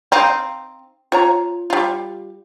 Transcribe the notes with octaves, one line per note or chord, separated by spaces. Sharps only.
C4 D#4 F5
F4 C#5 A#5
G3 F4